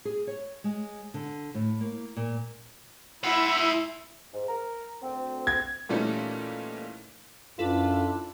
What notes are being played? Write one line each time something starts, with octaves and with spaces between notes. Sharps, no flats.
G#4
C#5
G#3
D3
A2
A#3
A#2
E4 C5 E5 F#5
G#2
A#4 A#5
D2 C4
G#6
A#2 E3 G3 A3 C#4 D#4
F#2 D4 E4 F4 A4 B4